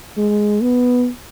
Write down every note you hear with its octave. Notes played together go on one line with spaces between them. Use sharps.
G#3
B3